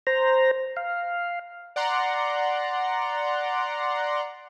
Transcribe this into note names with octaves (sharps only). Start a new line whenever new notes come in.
C5 A#5
F5
D5 F#5 A#5 C6